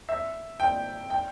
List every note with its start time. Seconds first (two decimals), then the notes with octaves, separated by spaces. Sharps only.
0.09 E5
0.60 G5
1.10 G5